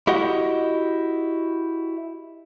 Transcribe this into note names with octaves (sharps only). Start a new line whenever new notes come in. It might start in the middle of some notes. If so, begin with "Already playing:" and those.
E4 F#4 G4 D#5 F#5